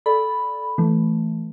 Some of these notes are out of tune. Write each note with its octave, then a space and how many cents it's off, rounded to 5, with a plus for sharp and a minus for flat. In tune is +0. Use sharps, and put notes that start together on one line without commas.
A4 -10 D5 +0 B5 +0
E3 +5 A3 +0